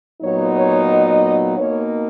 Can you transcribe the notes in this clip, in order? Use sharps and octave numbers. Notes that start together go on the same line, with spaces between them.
A#2 F#3 B3 D#4 C#5
C#5
D#5
B2 A#3 D#4 C#5